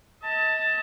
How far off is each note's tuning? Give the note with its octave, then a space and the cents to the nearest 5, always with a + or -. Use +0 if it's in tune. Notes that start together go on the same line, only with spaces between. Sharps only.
D#5 +40 A5 +10